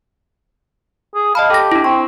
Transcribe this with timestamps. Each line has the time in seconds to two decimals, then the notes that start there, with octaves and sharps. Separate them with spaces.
1.15 G#4
1.35 D#5 F5 A5 B5
1.50 G4 A4 A#6
1.72 D4 E4
1.84 C4 C#6